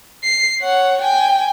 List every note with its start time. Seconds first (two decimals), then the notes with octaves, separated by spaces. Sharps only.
0.24 C7
0.61 C#5 F#5
1.02 G5 G#5